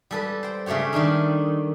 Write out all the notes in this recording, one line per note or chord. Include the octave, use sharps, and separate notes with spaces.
G3 A4 B4
C5 G5
C#3 A3 G4 C#5 G5
D#3 G3 D4 D#4